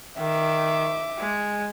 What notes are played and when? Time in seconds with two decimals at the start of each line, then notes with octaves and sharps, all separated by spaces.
0.19 D#3 E5 D6
1.19 G#3